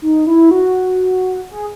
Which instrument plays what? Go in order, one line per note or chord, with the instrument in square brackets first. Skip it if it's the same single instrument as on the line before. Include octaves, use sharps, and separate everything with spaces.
[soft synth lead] D#4
E4
F#4
G#4